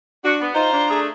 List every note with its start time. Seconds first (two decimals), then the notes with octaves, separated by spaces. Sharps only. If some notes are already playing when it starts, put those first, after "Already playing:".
0.24 D4 F#4
0.41 B3
0.55 D#4 F4 C5 A#5
0.73 D4
0.90 A3 G#4